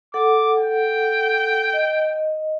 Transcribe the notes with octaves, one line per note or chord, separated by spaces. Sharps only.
A4 F#5 D6
G5
D#5